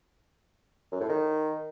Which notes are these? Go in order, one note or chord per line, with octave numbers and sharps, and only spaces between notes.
F#2
A2
D#3